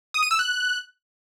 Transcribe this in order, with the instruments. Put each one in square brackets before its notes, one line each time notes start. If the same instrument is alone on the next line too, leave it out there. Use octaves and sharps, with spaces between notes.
[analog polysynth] D#6
D#7
E6
F#6